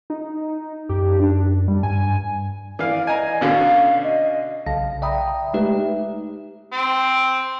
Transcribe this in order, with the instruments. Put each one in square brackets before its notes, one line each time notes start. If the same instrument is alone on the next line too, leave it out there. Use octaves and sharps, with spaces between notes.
[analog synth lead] D#4
[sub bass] F#2 [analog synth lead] G4
[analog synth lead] D4
G3
[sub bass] G2 [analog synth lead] G#5
[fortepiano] E3 F5 [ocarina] D5
[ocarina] D#5 [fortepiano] G#5 A#5
[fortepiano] B2 D3 C#4 [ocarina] F5
[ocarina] D#5
[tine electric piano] B1 C#3 F5 A5 A#6
D5 E5 G5 A#5 B5 D#6
G#3 A3 D#4 G4 B4 E5
[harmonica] C4